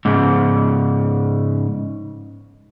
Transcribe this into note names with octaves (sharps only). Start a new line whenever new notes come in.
G#2 C#3